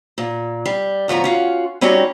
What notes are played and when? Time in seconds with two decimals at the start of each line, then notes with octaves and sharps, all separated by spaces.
0.18 A#2
0.66 G3
1.08 D2 A2 F3 B3 A#5
1.24 C#4 F4 F#4
1.81 G3 C4 C#4 D#4 F#4 G4